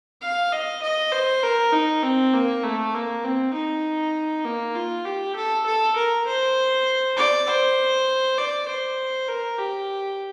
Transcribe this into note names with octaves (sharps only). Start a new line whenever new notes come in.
F5
D#5
D#5
C5
A#4
D#4
C4
A#3
A3
A#3
C4
D#4
A#3
F4
G4
A4
A4
A#4
C5
D5
C5
D5
C5
A#4
G4